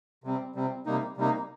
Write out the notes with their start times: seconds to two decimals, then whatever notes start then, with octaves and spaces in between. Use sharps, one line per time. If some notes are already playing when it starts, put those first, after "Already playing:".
0.24 C3 G3 C4
0.55 C3 G3 C4
0.86 C3 G3 A#3 D#4
1.17 C3 G3 A#3 D#4